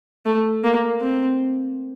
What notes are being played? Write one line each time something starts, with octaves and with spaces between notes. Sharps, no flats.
A3
A#3
C4